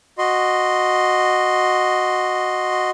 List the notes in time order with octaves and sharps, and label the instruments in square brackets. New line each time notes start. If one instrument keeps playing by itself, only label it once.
[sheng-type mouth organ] F#4 D#5 C6